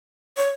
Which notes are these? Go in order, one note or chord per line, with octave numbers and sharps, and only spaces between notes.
C#5